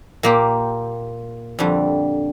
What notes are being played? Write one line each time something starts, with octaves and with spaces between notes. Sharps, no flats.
A#2 A#3 G4
F2 D3 G3